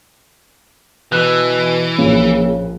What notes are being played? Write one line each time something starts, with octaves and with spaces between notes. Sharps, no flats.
B2 E3 F#6
A#1 A#2 C#3